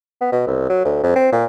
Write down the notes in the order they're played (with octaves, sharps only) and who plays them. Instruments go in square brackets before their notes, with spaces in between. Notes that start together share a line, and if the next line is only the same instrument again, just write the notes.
[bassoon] B3
B2
C2
F#3
D2
F2
C4
A#2